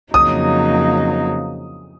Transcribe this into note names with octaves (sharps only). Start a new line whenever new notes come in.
F2 C#3 F#3 A#3 D#4 D#6